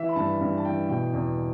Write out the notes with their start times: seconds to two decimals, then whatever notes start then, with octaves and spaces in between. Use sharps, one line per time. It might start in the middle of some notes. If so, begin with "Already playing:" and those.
Already playing: E3 E5
0.09 B5
0.16 G2 A5
0.41 G2
0.58 A5
0.65 E3 G5
0.89 B2 G5
1.13 E2